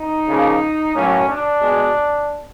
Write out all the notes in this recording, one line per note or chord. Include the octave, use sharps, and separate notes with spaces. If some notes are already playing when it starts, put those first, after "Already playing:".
Already playing: D#4
C#3 F3 A#3
A2 F#3 A#3 C#4
D4
B2 G#3